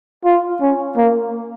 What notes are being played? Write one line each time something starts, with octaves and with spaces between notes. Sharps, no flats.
F4
C#4
A#3